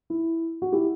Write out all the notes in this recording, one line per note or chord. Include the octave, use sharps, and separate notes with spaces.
E4
F#4
E4 G4